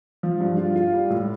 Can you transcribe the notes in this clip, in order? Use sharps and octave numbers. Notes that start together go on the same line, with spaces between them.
F3
G2
F4
F4
G3
A2